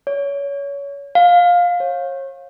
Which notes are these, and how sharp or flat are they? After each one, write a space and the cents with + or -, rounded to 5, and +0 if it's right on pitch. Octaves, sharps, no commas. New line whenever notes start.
C#5 +25
F5 +15
C#5 -35